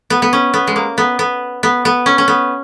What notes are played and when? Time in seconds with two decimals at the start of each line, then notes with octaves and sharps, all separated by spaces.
0.10 B3
0.22 B3
0.33 C#4
0.54 B3
0.67 G#3
0.76 A#3
0.98 B3
1.19 B3
1.63 B3
1.85 B3
2.06 C#4
2.18 C#4
2.28 B3